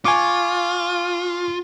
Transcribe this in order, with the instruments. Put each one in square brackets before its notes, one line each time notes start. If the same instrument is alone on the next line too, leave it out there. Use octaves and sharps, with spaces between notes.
[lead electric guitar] F4 [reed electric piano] G#5 C#6 D6